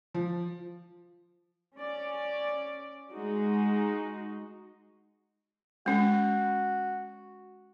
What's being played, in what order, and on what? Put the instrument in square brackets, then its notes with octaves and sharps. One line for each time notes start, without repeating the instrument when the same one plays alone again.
[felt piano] F3
[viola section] C#4 D5
G#3 D#4 F#4
[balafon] G#3 C#4 [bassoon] F#4